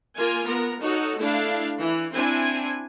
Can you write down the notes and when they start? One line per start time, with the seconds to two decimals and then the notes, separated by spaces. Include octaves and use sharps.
0.16 A#3 F4 A#4 G#5
0.46 B3 A#4 A#5
0.82 D#4 F#4 A4 C#5
1.19 A3 D4 E4 F5
1.81 E3
2.14 C4 D4 E4 G#5